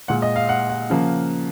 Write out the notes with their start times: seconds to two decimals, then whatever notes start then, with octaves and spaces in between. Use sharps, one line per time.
0.08 A#2 G#3 F#5
0.22 D#5
0.36 F5
0.49 F#5
0.69 F#5
0.90 C#3 F3 A#3